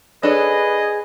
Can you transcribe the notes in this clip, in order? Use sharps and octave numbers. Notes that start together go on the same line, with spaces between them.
D4 G#4 A4 B4 C#5 D#5